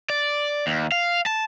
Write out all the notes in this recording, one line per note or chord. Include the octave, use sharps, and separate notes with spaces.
D5
D#2
F5
A5